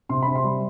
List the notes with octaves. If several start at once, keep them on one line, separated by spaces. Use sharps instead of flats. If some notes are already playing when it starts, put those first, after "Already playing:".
C3 C6
C3 B5
C6
G3